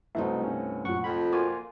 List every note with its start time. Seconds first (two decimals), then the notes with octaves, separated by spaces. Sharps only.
0.15 C2 B2 A3 C4 D#4 E5
0.41 G2 C#4
0.85 F#2 A#2 F#5 C#6
1.04 F2 B5
1.33 A#3 F4 F#4 G#5 D6